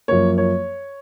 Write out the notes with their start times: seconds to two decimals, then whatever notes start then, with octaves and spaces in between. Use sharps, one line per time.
0.08 F#2 F3 A#3 C#5
0.38 C#5